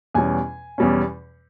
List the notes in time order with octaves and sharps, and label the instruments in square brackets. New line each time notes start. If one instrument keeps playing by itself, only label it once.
[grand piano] E2 B2 G3 C#4 G#5
E2 B2 G3 C#4